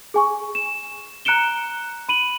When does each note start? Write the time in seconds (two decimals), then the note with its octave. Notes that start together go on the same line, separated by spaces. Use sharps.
0.14 G#4 G#5 C#6
0.55 E7
1.25 A#5 F#6 C#7 D7 E7 G7
2.09 B5 D#7 F#7